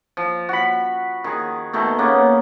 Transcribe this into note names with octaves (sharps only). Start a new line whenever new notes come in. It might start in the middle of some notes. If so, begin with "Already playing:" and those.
F3
F#4 B5
D#3 G#4
B2 D#3 A3
C#3 A#3 B3